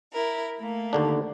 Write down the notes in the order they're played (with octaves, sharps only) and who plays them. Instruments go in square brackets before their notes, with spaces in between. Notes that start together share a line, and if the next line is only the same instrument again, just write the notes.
[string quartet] E4 A#4
A3 A#3
[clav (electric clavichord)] D#2 D3 D4